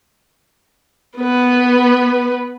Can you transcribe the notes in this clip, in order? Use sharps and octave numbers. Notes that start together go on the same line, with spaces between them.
B3 B4